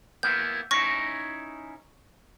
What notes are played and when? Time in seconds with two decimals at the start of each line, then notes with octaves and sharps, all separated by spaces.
0.23 A#3 B3 E4 G6
0.71 C#4 D#4 E4 C#6 A#6